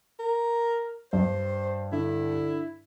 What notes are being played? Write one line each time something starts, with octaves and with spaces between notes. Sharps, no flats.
A#4
G2 C5
D3 E4